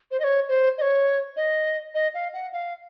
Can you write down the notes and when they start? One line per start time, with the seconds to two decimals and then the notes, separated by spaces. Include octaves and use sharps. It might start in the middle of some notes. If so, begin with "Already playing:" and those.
0.11 C5
0.20 D#5
0.24 C#5
0.48 C5
0.78 D#5
0.81 C#5
1.36 D#5
1.94 D#5
2.14 F5
2.33 F#5
2.53 F5